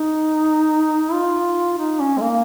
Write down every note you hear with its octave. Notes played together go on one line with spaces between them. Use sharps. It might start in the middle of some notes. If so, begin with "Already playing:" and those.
Already playing: D#4
F4
D#4
C#4
G#3
A#3